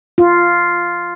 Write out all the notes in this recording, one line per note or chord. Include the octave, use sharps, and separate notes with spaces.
F4